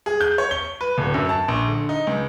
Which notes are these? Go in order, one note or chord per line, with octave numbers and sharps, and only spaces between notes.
G#4
G6
C#5
G7
B4
D1
F#2
A5
A#1
D3
D#4
C#2